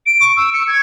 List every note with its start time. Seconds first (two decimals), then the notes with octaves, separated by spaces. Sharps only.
0.06 D7
0.21 C#6
0.36 E6
0.53 C#7
0.68 G#6